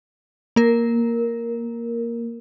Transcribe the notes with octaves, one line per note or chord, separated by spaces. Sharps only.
A#3 A#4